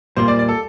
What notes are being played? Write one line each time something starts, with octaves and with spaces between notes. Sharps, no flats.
A#2 G3 A#3 F4 C5
D5
D5
A4